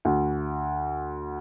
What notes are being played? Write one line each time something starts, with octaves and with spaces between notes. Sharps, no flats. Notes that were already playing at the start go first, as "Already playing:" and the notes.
D2